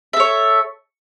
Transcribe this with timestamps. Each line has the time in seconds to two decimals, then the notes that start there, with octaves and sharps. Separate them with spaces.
0.13 E5
0.17 A4
0.20 C#5